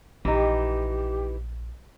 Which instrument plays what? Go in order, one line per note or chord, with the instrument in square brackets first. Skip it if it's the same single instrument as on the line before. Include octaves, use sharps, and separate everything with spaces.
[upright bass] A#1 [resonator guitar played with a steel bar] E3 D#4 [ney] G4